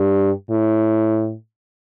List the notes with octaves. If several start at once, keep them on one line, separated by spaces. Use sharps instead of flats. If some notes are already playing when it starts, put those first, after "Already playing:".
Already playing: G2
A2